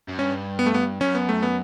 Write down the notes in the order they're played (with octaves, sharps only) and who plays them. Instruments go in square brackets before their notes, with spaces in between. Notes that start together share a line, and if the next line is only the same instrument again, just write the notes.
[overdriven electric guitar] F#2
[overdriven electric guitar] G2 [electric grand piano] C#4
[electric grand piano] B3
A3
B3
[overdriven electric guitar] F#2 [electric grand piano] C#4
[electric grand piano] B3
A3
B3